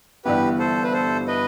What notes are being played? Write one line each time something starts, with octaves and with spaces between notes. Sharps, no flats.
G1 G2 E3 B3 E4 G4 B4
A4 C5
B4
A4 C5
B4 D#5